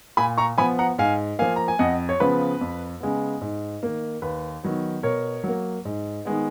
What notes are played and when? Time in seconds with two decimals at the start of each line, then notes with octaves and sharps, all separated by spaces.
0.17 A#2 G#5 B5
0.38 A#5 C#6
0.58 F3 B3 G#5 B5
0.79 F#5 A#5
0.98 G#2 F5 G#5
1.39 F3 A#3 F5 G#5
1.56 A#5
1.68 G#5
1.79 F2 D#5 F#5
2.09 C#5
2.20 C#3 F3 B3 B4
2.61 F2
3.01 C#3 G#3 B3
3.41 G#2
3.83 D#3 A#3
4.22 D#2 B4
4.64 D#3 F#3 B3
5.03 B2 A#4 C#5
5.44 F#3 A#3
5.85 G#2
6.25 D#3 G#3 B3